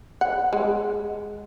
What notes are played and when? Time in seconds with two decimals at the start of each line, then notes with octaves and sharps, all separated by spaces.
0.21 F#5
0.53 G#3